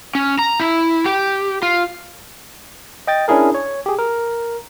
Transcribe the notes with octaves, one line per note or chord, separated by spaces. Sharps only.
C#4
A#5
E4
G4
F4
D#5 G5 A6
C#4 D4 E4 G#4 A#4
C#5
G4 G#4
A#4